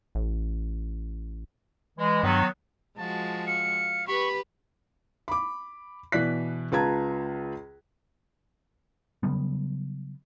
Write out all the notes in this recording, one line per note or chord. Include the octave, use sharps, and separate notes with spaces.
A1
E3 G#3
G2 D#3 F#3 B3
F3 G#3 F#4 A5
F5 C#7
G4 B4 B5 C#6
B5 D6
B2 E3 D5 F#6 B6
C#2 F4 B4 A5 A#5 G#6
C#3 F#3 G3 B3